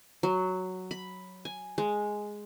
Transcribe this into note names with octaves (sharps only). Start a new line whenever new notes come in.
F#3
B5
G#5
G#3